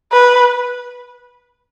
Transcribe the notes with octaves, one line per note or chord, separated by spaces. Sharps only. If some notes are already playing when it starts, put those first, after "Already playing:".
B4